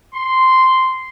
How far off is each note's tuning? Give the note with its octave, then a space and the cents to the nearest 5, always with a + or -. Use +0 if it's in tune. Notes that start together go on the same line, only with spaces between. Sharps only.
C6 -5